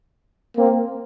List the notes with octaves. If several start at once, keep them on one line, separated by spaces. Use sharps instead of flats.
A#3 C4